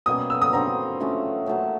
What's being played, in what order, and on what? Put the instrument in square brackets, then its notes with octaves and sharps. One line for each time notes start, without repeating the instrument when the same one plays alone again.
[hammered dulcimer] B2 G3 A#3 C#4 [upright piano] D#6
[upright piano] E6
D#6
[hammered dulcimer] D3 G3 C4 [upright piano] A#5
[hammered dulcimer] F#3 A3 C#4 F4
A#2 F#3 A3 C#4